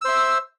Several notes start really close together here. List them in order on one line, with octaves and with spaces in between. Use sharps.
E6 C5 E5